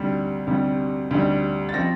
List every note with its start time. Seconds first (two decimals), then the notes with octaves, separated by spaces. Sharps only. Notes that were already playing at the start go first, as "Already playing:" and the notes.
Already playing: D2 C3 G3
0.47 D2 C3 G3
1.11 D2 C3 G3
1.69 A6
1.74 F3 C4 A#6